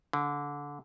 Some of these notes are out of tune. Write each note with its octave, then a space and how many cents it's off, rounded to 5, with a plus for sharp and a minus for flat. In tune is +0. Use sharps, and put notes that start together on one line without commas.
D3 -20